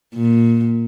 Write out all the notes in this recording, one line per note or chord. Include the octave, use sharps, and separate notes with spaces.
A#2